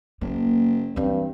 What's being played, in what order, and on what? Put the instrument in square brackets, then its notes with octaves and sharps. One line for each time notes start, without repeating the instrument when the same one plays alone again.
[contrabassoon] F#1 [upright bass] A#3
[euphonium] G2 [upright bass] E3 C4